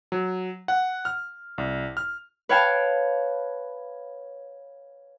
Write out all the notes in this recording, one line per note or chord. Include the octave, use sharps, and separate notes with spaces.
F#3
F#5
F6
C2
F6
B4 C#5 F5 G5 A5